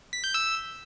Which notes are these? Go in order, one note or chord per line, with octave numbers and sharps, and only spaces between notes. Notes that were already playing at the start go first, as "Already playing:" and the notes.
B6
G6
E6